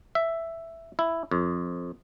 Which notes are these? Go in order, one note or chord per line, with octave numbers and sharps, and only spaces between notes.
E5
E4
F2